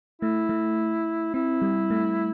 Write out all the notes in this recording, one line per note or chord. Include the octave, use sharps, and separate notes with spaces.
A3 E4
A3
C4 E4
G3
A3